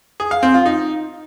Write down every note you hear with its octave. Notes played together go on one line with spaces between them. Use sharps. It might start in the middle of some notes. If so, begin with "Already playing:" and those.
G#4
F5
C4
F4
D#4